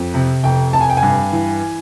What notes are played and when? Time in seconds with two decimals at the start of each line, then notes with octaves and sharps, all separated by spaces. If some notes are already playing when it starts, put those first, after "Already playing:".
Already playing: F2
0.14 C3
0.44 F1 G5
0.73 F1 A5
0.81 G#5
0.90 G5
0.97 G#5
1.03 G2
1.33 E3